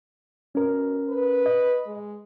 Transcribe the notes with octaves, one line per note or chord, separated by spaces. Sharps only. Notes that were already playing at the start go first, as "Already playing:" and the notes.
B2 C#4 A#4
B4
D#5
G#3